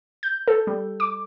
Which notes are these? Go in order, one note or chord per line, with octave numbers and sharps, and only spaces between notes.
G6
A4
G3
D6